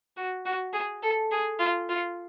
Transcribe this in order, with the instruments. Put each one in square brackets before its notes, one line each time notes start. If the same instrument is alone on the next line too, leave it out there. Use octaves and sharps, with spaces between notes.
[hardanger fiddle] F#4
F#4
G#4
A4
G#4
F4
F4